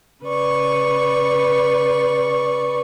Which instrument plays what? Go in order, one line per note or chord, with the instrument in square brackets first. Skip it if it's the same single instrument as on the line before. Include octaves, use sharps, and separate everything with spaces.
[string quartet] C#3 B4 D5 C#6